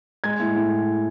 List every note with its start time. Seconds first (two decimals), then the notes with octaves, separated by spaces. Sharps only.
0.24 G#3 G#6
0.40 A2
0.55 A2